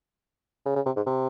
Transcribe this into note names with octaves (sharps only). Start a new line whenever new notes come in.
C#3
C#3
C3
G#2
C3